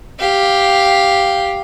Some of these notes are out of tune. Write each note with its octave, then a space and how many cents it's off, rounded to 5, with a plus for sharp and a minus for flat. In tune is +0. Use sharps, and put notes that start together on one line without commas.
G4 +0 F5 +0